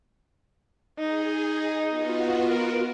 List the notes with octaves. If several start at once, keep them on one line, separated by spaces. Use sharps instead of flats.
D#4 G#4
B3 F4 F#4
A#4